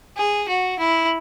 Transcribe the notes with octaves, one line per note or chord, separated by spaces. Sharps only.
G#4
F#4
E4